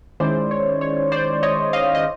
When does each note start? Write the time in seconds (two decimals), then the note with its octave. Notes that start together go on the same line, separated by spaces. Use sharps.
0.20 D#3 G#3 C#4 E4 C5 D5
0.51 C#5
0.81 C#5
1.12 C5 D5
1.43 C#5 D#5
1.73 D#5 F5
1.95 D#5